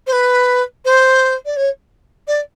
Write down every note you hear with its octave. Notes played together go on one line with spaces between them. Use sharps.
C5
B4
C5
D5
C#5
D5